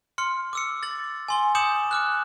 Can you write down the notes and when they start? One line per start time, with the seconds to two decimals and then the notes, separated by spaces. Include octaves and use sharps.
0.18 C6 F6 C#7
0.53 D6 E6 C#7
0.83 A6 F#7
1.28 G#5 C6 G7
1.55 D6 D#6 G6 C#7 E7 F#7
1.91 D6 F6 F#6